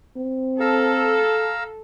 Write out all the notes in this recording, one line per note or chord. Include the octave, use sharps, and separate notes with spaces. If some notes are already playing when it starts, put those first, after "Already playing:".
C4
A4 F5 A#5 E6